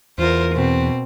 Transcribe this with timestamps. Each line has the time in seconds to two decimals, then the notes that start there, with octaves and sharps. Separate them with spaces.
0.18 E2 F4 A#4 C5
0.54 B2 C4